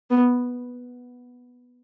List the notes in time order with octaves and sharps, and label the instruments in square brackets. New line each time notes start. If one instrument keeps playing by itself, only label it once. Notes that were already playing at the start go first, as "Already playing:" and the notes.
[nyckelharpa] B3